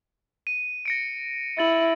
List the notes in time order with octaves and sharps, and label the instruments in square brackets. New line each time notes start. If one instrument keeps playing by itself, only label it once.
[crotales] D#7
A#6 C#7 D7
[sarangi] E4 [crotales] A6 F#7